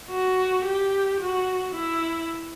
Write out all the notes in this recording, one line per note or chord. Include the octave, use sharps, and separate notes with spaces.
F#4
G4
F#4
E4